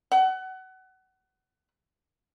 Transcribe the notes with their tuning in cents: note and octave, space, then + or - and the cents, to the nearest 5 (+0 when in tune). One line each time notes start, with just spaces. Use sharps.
F#5 +25